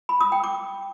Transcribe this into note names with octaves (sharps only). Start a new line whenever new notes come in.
B5
D#6
G5
D6